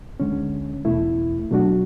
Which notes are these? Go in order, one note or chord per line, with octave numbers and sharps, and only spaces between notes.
D2 D3 G#3 C#4
E2 B2 A3 E4
B2 F#3 A3 D4 F#4